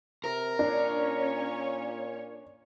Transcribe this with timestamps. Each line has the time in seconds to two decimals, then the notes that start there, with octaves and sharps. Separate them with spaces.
0.24 C3 A#4
0.59 A#2 C#4 D4 C#5